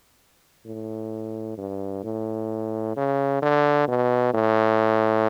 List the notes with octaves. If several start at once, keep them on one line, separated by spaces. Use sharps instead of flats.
A2
G2
A2
C#3
D3
B2
A2